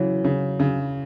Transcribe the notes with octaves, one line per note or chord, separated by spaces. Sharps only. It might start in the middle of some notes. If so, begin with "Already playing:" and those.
Already playing: C#3 E3 F#3
C#3
C#3